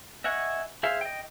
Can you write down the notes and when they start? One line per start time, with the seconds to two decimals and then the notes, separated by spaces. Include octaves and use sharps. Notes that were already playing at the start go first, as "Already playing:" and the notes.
0.24 D#5 E5 F#5 G#5 C#6
0.83 G#4 C5 E5 F5
1.01 D#5 G5